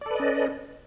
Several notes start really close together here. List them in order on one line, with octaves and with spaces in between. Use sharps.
D5 A4 B4 D#5 C#4